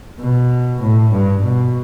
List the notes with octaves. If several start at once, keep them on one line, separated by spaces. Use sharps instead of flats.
B2
A2
G2
B2